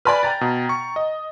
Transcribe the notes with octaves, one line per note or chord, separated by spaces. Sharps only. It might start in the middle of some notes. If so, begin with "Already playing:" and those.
B4 D5 G#5 B5 F6
G5 A#5 A6
B2
C#6
D#5